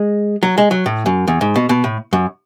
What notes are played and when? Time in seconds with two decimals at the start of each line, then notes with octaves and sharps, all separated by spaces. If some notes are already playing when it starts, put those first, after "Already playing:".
Already playing: G#3
0.43 F#3
0.58 G#3
0.71 F#3
0.86 A2
1.06 F#2
1.27 E2
1.41 G#2
1.56 B2
1.69 B2
1.84 A2
2.13 F#2